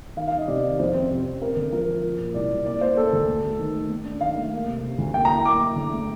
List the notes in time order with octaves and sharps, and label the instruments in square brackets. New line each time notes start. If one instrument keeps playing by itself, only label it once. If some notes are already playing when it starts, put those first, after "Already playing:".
[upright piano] D#3 [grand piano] F5
[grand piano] F5
[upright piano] D#3
[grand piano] D#5
[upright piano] C3 [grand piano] D5
[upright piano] D#3
[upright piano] F2 [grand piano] C5
[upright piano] C4
C3
C4
[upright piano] C4 [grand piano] A#4
[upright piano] D3
[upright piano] F3 [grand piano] A#4
[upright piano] F3
F3
A#2
[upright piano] C2 [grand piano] D5
[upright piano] C2
[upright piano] A#3 [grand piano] D5
[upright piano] A#3 [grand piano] C5
[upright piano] A#3 [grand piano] A4
[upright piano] D2
A3
A3
D#3
A3
A3
D4
[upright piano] D#3 [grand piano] F5
[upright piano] A3
A#3
C3
C3
D2
[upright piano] A#3 [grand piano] G5
[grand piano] A#5
[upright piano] A2
[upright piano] A#3 [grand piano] D6
[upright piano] A2
D3
A3